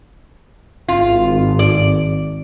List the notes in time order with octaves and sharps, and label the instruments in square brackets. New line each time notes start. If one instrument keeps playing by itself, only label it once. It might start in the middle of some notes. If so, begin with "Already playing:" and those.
[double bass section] G#1 [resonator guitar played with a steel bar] F4
[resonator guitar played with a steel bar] D5